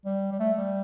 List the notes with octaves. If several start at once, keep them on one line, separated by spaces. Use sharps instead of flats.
G3
G3
A3
G3